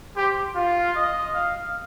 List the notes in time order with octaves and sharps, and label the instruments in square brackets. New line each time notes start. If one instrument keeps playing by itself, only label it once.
[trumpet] G4 [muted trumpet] C5
[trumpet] F4 [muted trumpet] F5
[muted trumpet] D#5
F5